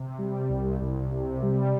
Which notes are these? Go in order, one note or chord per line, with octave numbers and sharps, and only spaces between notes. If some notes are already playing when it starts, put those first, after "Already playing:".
Already playing: C3
G3
C2
C2
C3
G3